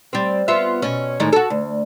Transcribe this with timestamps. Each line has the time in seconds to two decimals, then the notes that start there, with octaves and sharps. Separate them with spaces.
0.13 G3 C4
0.48 B3 F4 E5
0.82 B2 C#4
1.20 A2 D#3 G#3
1.33 F#4 A4
1.50 D2